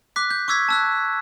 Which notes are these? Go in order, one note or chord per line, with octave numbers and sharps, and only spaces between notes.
D6 F#6 B6
G6
C#6 D6 E6 G#6 B6
A5 E6 F#6